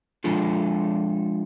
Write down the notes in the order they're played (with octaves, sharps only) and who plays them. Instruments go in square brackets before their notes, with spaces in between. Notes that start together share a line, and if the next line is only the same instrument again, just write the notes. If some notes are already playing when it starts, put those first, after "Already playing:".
[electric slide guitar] F3 G#3 D4 F4 A4